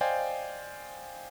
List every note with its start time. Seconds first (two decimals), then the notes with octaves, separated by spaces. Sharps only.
0.01 C5 D5 D#5 F5 G5 G#5